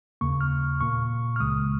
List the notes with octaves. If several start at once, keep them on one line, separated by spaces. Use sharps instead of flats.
D#2 C#3 A#3 C#6
F6
A#2 A#3 C#6
F6
C#2 C#3 G#3 D#6